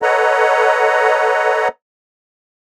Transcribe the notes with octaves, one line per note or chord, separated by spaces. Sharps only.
A4 B4 C#5 D#5 F#5 A#5